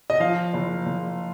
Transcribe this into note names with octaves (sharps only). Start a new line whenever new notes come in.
D#5
F3 F5
F#1
F#1